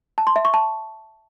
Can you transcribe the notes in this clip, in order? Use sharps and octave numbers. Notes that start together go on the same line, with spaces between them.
A5
C6
E5
C#6
A5